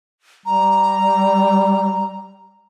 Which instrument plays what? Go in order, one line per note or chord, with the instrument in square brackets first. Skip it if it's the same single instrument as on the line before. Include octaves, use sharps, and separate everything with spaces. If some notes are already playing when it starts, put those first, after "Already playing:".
[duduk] G3 [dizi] A#5